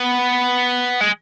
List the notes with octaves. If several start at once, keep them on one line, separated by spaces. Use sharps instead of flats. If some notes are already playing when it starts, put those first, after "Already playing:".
Already playing: B3
G#3